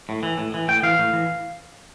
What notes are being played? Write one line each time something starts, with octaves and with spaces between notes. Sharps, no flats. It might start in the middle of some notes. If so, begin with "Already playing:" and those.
A2
E3
A2
E3
A2 G5
E3 F5
A2
E3